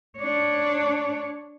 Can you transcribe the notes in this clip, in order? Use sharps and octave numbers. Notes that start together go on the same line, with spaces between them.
D4 C#5